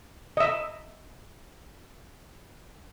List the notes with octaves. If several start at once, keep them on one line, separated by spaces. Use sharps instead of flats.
D#5 E5